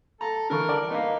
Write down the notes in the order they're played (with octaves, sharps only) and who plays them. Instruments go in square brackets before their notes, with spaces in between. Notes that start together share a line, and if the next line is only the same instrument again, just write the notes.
[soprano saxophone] A4 [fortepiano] A#5
[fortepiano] D3 E3 C#6 [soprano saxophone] A#4
[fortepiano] A4 D5 A5
[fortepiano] A#3 B3 [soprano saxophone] D#4